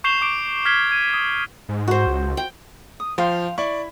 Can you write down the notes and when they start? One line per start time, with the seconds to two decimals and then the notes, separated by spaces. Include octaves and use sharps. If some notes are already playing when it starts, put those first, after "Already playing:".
0.04 C#6 G6 C7 E7 F7 G7
0.21 C#6 D6 D7 E7
0.65 F6 G#6 B6 C7 G7
0.91 G#6 D#7
1.10 D#6 B6
1.69 G#2
1.88 F#4 C5
2.07 C#2
2.37 G5
3.00 D#6
3.18 F3 F5 G5 C6
3.58 E4 D5 C#6